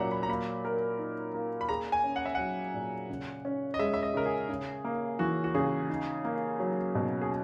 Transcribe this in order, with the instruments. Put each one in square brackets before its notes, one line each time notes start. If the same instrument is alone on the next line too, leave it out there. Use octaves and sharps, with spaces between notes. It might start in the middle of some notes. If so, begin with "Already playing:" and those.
Already playing: [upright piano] A#2 F#3 C#4 [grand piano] E5 F#5 A#5
[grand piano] B5
A#5
[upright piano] A#3 [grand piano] B5
[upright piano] A#4
D#4
A#3
[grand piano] B5
[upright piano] G#4 [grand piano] A#5
[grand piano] G#5
[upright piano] C#4
[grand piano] F#5
E5
[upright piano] F#3 [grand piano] F#5
[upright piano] A#2
C#3
C#4
[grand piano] D#5
[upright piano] G#3 [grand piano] E5
[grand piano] E5
D#5
[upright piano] C#3 [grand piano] A#4
[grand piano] G#4
[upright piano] C#3
A#3
[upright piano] E3 [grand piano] F#4
[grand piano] F#4
[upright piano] C#3 [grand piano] G#4
[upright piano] D#4
A#3
F#3
B2
[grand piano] G#4